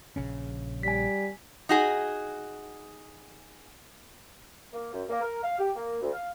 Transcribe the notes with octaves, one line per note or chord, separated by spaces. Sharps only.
A#1 C#3 C#4
G3 G#5 B6
D#4 F#4 G#4
A#3
F#2
A#3
A#4
F5
G4
A#3
D2
F5